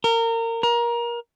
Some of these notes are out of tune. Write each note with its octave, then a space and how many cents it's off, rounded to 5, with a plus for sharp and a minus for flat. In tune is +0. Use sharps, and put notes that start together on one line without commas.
A#4 -25
A#4 +25